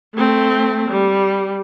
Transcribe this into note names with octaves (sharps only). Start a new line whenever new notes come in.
A3 C4
G3